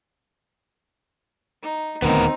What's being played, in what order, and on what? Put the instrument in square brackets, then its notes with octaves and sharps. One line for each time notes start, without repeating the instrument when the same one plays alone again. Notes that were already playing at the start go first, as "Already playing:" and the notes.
[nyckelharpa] D#4
[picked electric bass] D#1 D2 D#3 [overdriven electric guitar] B3 A#4 [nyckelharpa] C4 D#4